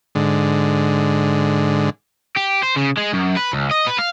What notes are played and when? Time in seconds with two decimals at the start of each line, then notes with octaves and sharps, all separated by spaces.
0.15 G#2 D3
2.37 G4
2.63 C5
2.77 C#3
2.98 G#3
3.14 F#2
3.37 B4
3.53 C#2
3.71 D#5
3.87 B4
3.98 F5